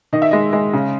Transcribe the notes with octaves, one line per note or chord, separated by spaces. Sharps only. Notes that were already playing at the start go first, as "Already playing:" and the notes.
D#3 D#5
E5
G#3 D#5
G#3
C#3